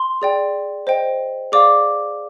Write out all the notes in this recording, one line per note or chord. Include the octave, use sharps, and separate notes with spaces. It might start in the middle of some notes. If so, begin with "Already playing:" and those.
Already playing: C6
G#4 D5 G5
C5 D#5 G5
G#4 D5 F5 D6